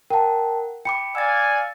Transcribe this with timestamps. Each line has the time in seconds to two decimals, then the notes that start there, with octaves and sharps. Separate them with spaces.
0.10 A#4 F#5 G5 A5
0.85 G5 B5 D6 C#7
1.15 D5 F5 G#5 E6 A6